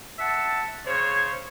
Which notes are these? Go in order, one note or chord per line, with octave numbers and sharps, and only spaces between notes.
E5 F#5 A5
C#3 C5 C#5